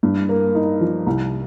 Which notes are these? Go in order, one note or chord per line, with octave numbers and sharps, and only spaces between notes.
G2
A#3
D#4
F3
C2